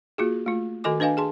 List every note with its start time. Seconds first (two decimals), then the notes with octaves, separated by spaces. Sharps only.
0.18 A#3 F4 F#4 G#4
0.46 A3 F4
0.84 D#3 F#4 A4 D#5 G#5 D6
1.00 D4 B4 D#5 F5 G#5
1.17 G#4 A5 C6